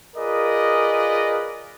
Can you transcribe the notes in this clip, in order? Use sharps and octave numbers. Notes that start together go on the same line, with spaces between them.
F4 G#4 A#4 B4 D5 D#5